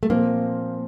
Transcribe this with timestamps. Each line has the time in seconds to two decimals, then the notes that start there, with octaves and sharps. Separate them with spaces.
0.03 A3
0.10 A#2 F3 A#3 C4